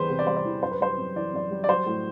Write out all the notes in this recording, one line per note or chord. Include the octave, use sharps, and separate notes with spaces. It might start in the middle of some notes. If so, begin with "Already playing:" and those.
Already playing: E2 E3 G3 B4 C5
C3
D5
G3 C5
D5
E3
F#2 C5
B4
G3 C5
F#2
E3 D5
F#2 D5
G3
D5
F#3 C5
A2